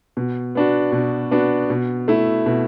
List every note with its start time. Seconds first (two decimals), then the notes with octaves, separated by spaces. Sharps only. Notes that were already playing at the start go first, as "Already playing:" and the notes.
0.17 B2
0.55 B3 D4 F#4
0.92 B2
1.31 B3 D4 F#4
1.70 B2
2.08 A3 E4
2.46 B2